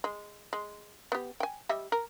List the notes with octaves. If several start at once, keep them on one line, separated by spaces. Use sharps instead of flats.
G#3
G#3
B3 G4
G5 G#5
G3 D#5 E5
A#4